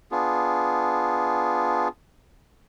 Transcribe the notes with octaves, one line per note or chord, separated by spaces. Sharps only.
B3 D4 F4 G#4